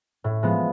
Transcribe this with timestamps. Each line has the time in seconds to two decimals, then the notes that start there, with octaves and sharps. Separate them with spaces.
0.24 A2
0.43 F3 G#3 B3